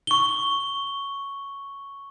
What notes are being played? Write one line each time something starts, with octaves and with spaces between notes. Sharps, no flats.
C#6 G7